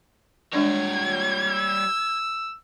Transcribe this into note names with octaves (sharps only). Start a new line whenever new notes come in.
G3 G#3 D4 C#5 D5 G#6
E6